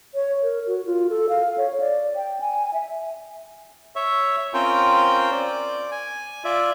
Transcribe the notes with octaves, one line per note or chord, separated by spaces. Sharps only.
C#5
A#4
F#4
F4
A4
F5
C#5
D5
G5
G#5
E5
C#5 E5
C4 C#4 F4 A#4 C5 G5
D5
G#5
F4 D5 E5